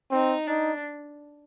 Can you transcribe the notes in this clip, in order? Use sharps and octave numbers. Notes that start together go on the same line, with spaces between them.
C4 D#4
D4 D#4